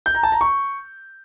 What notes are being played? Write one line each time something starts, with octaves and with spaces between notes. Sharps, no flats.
G6
A#5
A5
A#5
C#6